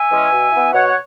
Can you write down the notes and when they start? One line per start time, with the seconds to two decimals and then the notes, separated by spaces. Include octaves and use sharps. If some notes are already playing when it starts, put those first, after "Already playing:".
Already playing: E5 G#5
0.09 E3 G#3 C#4
0.31 B2
0.52 B3 E4
0.73 B2 C#5 F#5
0.88 F#5